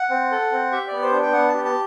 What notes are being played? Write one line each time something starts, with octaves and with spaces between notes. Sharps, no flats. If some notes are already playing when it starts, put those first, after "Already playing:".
Already playing: F#5
C4
A4
C4
G4 E5
B3 D5
C5
D4
G5
B3 F#5
G4 A5
A5